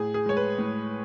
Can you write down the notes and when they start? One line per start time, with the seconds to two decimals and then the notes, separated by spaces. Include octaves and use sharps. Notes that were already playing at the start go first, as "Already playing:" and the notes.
Already playing: A2 G#4
0.14 G#4
0.26 G#3 C#5
0.37 B4
0.58 A2